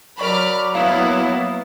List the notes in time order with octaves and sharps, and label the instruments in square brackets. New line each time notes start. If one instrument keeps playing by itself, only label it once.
[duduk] F#3 [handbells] A#4 D5 C#6 [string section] B5 D6 F6
[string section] A#3 B3 E4 [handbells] F5